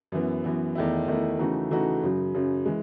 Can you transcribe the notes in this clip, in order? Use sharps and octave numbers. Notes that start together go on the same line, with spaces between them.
F#2 E3 B3
F#2 E3 B3
E2 D#3 A3 E4
E2 D#3 A3 E4
C#3 E3 A3 D#4 F#4
C#3 E3 A3 D#4 F#4
F#2 C#3 F#3
F#2 C#3 F#3
E3 G#3